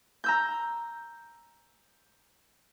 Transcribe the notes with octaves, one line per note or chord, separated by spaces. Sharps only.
A#5 E6 G6